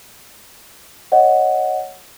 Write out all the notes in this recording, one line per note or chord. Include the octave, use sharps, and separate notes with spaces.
C#5 D#5 F#5